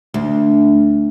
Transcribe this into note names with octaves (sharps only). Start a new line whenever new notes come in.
D2